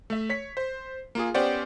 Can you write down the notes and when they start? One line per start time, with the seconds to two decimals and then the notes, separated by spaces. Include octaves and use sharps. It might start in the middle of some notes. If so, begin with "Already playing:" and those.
0.10 A3 E5
0.29 C#5 B6
0.57 C5
1.15 A#3 F4 G#4
1.34 B3 C#4 G4 C5 D5 F#5